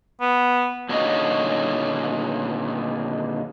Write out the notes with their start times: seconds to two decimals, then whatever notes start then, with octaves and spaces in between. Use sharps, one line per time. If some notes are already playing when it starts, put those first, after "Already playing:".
0.21 B3
0.89 A#2 D3 D#3 C#4 F#4 D#5